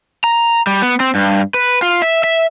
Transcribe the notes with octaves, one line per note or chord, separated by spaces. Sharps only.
A#5
G3
B3
C4
G2
B4
F4
E5
E5